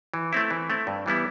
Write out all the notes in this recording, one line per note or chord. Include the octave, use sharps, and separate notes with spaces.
E3
A3 C4 E4
E3
A3 C4 E4
G2
E3 G3 B3 E4